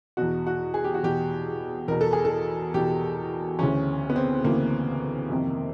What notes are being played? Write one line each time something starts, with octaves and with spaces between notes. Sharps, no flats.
E2 B2 F#4
F#4
G#4
G4
F#4
E2 B2 G4
E2 B2 A#4
A4
G#4
A4
E2 B2 G4
D2 C#3 E3 C#4
B3
C4
D2 C#3 E3 A#3
F2 C3 D#3